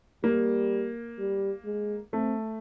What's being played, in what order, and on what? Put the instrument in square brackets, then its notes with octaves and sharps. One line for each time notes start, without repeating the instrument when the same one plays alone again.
[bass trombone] G3 [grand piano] A#3
[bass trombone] G3
G#3
[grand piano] A3 [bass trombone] C4